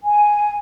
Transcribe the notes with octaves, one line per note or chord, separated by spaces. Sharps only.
G#5